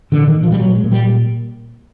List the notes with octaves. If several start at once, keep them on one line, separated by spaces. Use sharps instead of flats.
A#2 D3
D#3
A#2
F3
G3
A#2 F#3
G#3
A#2
G3